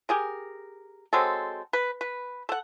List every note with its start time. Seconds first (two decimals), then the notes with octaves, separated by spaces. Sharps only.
0.09 G4 G#4 A#4
1.13 F#3 G#3 C4 A4
1.73 B4
2.01 B4
2.49 A4 F#5